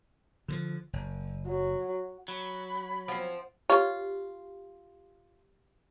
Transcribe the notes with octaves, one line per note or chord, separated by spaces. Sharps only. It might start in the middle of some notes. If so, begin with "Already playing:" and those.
D3 D#3 F3
F#1
F#3
F#3 B5
F3 C4 C5 F#5
F4 G4 C#5